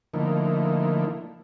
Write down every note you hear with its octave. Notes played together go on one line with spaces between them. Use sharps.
D3 F3 A3 A#3 D#4 E4